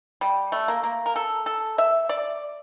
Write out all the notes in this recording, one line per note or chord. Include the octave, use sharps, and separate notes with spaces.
G3
A3
A#3
A#3
A#4
A4
A4
E5
D5